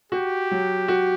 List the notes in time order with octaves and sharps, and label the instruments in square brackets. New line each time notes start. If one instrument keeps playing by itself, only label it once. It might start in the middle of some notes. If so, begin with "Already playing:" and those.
[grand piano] F#4 [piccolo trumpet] G4
[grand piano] F#3
F#4